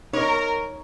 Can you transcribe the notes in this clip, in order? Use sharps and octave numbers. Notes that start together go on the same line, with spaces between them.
D#4 A#4 C#5